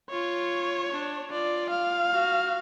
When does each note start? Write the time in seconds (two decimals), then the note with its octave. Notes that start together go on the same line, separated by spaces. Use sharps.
0.10 F4 C#5
0.91 D4
1.31 F4 D5
1.71 F5
2.11 F#4